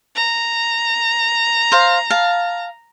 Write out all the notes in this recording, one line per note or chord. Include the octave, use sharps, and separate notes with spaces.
A#5
C5 F5
F5 A5